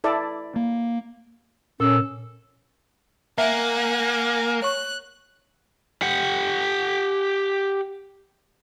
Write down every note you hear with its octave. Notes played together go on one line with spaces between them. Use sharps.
E4 A4 D5
A#3
A#2 C#4 A4
A#3 E5 F#5 G#5
C#5 C#6 F#6
G4 F#5